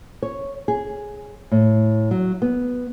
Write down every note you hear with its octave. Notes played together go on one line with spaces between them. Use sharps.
C#5
G#4
A2
F#3
B3